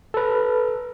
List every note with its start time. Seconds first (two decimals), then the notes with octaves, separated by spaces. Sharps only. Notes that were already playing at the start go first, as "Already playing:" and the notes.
0.14 A4 B4